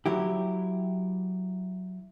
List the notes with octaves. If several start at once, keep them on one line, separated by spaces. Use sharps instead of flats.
F#3 E4 G4